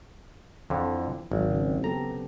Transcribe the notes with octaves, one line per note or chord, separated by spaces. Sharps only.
F2 D3 E3 F3
G#1 F#3
C#3 C4
B3 G4 A4 A#5